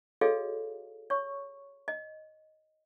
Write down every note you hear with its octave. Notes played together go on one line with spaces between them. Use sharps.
F#4 G#4 A4 C#5 D#5 F5
C#5 C#6
D#5